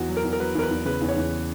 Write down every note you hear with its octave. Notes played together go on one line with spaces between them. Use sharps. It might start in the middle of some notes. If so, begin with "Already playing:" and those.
Already playing: E2 F#4
F#3
A#4
E2
A#4
F#3 B4
E2 A#4
B4
E2
C#3 B4
E2
C#5
E2